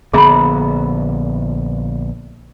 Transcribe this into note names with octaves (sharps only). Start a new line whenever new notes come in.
A#1 D3 B3 G#4 A#5 B5